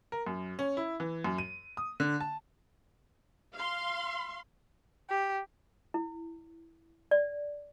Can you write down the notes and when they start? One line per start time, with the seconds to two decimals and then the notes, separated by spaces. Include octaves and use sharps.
0.12 A#4
0.27 F#2
0.59 C#4
0.77 E4
1.00 E3
1.24 F#2
1.38 D#7
1.77 D#6
2.00 D3
2.20 A5
3.55 F5 C6
5.10 G4
5.94 E4
7.11 D5